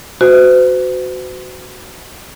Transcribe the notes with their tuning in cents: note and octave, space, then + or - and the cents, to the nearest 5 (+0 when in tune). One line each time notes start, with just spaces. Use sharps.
F#4 +0 C5 -45